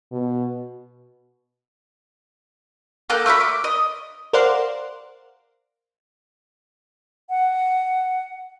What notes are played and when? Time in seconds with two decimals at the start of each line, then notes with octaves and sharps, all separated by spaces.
0.12 B2
3.10 A#3 A4 F#6 G6
3.26 A3 A#3 F#4 B5
3.40 D6
3.64 D#5
4.33 A#4 C5 D5 F5 F#5 C6
7.30 F#5